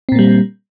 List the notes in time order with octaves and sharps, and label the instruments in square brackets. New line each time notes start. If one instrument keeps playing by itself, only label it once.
[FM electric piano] C4
A#2
A#3
G3